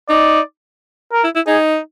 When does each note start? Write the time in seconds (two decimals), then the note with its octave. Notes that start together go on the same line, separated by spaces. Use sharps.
0.09 D#4 D5
1.13 A#4
1.24 E4
1.35 E4
1.47 D#4 G#4